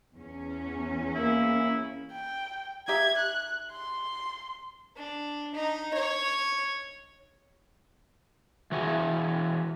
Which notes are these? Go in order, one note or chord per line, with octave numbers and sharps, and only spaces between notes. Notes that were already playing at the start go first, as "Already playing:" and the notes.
E2 C#4
A#3 E4
G5
D#4 G4 E5 G#6
F#6
C6
D4
D#4
C#5
E3 F#4 G#4